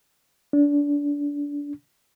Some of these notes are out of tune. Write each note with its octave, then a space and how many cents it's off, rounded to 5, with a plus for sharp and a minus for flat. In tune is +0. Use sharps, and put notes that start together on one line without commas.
D4 -25